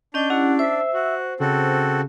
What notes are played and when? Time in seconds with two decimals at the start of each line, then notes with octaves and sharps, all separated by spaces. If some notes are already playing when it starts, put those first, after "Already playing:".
0.14 C#4 D4 D#5 G6
0.30 C#4 E4 G4 F#5
0.59 C5 E5
0.93 F#4
1.40 C#3 C4 F#4 A4